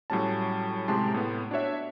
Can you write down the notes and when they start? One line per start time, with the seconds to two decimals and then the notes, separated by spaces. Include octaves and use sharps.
0.10 A2 F#3 G3 C#4 A5
0.88 A2 C3 G#3 G4 A5 C6
1.14 A2 B3
1.51 D4 F#4 C#5 E5